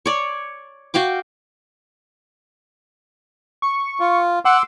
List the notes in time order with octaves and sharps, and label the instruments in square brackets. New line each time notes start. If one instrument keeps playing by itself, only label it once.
[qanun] C#5 D5
F#4 F5 G5 D6
[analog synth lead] C#6
[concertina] F4
[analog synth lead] F#5 [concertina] C6 D6 E6